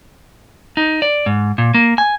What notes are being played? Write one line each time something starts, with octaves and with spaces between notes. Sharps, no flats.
D#4
D5
G#2
A#2
A#3
G#5